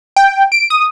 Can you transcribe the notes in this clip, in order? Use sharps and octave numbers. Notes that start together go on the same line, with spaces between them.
G5
D7
D#6